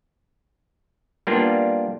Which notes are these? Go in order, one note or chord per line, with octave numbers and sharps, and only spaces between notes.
G3 A#3 B3 D4 F4